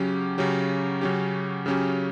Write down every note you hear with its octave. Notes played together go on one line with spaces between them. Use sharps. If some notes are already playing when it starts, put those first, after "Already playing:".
Already playing: C#3 F#3 C#4 G4
C#3 F#3 C#4 G4
C#3 F#3 C#4 G4
C#3 F#3 C#4 G4